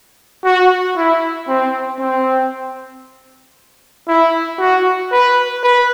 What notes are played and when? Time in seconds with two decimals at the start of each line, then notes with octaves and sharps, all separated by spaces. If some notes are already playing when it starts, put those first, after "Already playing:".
0.45 F#4
0.97 E4
1.49 C4
2.00 C4
4.08 E4
4.60 F#4
5.12 B4
5.63 B4